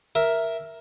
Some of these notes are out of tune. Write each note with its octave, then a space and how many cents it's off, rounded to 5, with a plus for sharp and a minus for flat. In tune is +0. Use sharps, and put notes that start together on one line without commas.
A#4 +5 E5 +0